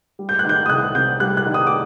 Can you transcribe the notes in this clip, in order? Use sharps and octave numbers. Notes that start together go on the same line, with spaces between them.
G3
G6
F#6
D#3 G6
D#6
C2 F#6
C3 G6
G3 F#6
F#6
D#3
D#6
D6